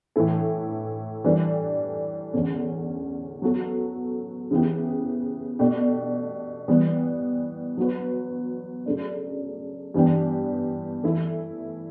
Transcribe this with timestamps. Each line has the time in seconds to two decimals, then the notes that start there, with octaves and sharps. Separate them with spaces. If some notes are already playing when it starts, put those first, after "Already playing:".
0.16 A2 E3 A3 E4 A4
1.24 E3 G3 D4 A4
2.33 E2 D3 A3 C#4
3.42 F#3 B3 F#4 A4
4.51 C#3 E3 B3 E4 G4
5.59 B2 A3 D4 G4
6.68 E3 G3 B3
7.77 F#3 B3 F#4 B4
8.86 C#3 F#3 A3 D4
9.94 G2 E3 B3 D4 G4
11.03 E3 A3 E4